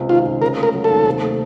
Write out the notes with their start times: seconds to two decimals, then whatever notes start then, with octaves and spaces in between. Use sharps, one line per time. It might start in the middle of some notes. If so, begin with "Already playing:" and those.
Already playing: C#2 C3
0.09 D#3 F4
0.25 C#2
0.41 C#3 A#4
0.58 A3
0.63 A#4
0.74 F#3
0.84 A4
0.90 D#2
1.06 C3
1.22 A3